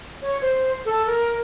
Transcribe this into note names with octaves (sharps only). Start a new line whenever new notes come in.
C#5
C5
A4
A#4